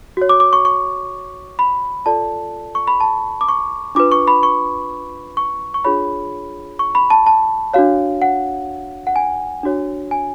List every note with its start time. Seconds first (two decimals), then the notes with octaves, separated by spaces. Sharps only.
0.17 F#4 C#5
0.29 D6
0.40 D6
0.53 C#6
0.65 C#6
1.59 B5
2.06 F4 A4 D5 A5
2.75 C#6
2.87 B5
3.00 A5
3.41 D6
3.49 C#6
3.95 D4 F4 B4 D6
4.12 C#6
4.28 B5
4.43 C#6
5.37 C#6
5.74 C#6
5.85 D4 F4 G#4 C#5 B5
6.79 C#6
6.95 B5
7.10 A5
7.26 A5
7.74 D4 F#4 C#5 F5
8.22 F#5
9.07 F#5
9.16 G#5
9.63 D4 F#4 C#5
10.11 G#5